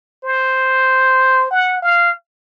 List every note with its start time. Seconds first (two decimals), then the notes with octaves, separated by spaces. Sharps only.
0.24 C5
1.51 F#5
1.82 F5